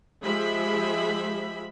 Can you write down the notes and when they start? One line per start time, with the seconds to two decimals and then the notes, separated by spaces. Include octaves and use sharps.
0.22 F3 G#3 G4 E5 B5